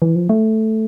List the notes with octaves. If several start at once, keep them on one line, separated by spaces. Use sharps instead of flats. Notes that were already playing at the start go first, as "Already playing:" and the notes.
E3
F3
A3